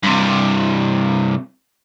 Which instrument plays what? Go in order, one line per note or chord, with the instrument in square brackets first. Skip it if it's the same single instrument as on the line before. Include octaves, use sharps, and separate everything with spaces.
[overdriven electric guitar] G2 C3